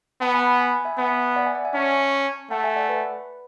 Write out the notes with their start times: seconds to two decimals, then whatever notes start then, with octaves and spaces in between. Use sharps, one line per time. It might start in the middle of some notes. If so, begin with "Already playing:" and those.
0.21 B3 F#5 A5
0.34 G#5 B5
0.47 G#5 B5
0.60 G#5 B5
0.85 E5 G#5
0.98 B3
1.36 D5 F#5
1.46 E5 G#5
1.55 D5 F#5
1.65 E5 G#5
1.74 C#4 A5 C#6
2.50 A3 F#5 A5
2.63 E5 G#5
2.76 D5 F#5
2.89 B4